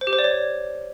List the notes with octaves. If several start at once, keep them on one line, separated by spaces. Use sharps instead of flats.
C5
G4
C5
D5
C#5